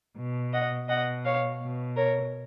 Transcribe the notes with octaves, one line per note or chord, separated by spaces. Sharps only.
B2
D#5 F#5
B2 D#5 F#5
C#5 F5
B2
A#4 C#5